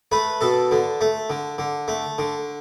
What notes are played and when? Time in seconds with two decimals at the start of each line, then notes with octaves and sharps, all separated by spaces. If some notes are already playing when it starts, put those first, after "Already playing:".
0.12 A3 B4
0.41 B2 A4
0.71 D3
1.01 A3
1.30 D3
1.58 D3
1.88 A3
2.18 D3